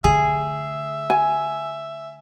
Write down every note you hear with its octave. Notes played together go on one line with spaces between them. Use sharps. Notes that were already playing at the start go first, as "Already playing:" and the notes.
D3 A3 G#4 E5
G#5